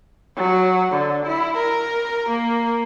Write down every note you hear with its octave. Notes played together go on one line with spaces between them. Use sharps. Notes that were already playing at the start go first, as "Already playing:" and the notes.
F#3
D3
E4
A#4
A#3